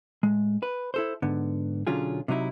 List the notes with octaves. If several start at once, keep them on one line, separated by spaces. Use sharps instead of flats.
A2 G#3
B4
E4 A4 C5
G#2 D3 B3
B1 D3 F#3 C#4 F4 G#4
C3 F#3 D#4 E4